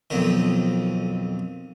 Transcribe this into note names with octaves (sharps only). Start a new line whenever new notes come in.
B1 F2 D#3